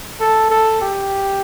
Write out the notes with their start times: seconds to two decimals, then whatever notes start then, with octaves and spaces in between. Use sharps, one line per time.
0.20 A4
0.50 A4
0.81 G4